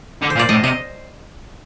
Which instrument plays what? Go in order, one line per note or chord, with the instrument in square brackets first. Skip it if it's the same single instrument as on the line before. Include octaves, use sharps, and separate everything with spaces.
[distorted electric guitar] D3
[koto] C5
[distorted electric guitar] A#2
[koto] D5
[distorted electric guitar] A2 [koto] D#5
[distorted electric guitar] C3 [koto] D#5